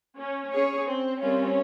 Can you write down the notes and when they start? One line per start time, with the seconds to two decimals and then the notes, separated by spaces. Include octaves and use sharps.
0.18 C#4
0.53 C#4 G#4 C#5
0.87 C4
1.21 G3 C4 C#4 F4 A#4